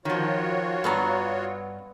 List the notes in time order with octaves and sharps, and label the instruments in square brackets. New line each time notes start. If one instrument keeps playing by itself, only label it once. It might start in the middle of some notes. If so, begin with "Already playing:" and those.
[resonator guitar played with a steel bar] D#3 F3 [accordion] F4 F#4 C#5
[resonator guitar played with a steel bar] G2 B3 A#5